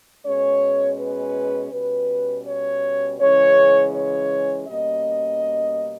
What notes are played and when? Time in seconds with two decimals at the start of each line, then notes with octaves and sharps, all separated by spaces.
0.25 B2 G#3 C#4 C#5
0.99 B4
1.73 B2 G3 C#4 B4
2.46 C#5
3.20 C#3 E3 G#3 C#4 C#5
3.94 C#5
4.68 B2 G3 A#3 C#4 D#5